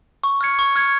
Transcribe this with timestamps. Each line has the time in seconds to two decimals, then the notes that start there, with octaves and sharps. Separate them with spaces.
0.24 C#6
0.41 F6 G#6 C#7
0.59 C#6
0.76 F6 G#6 C#7